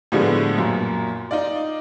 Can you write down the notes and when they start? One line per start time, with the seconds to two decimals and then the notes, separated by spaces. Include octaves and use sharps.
0.12 A2 D3 F3 G3 G#3 B3
0.58 F#2 A#2
1.31 D#4 F4 D5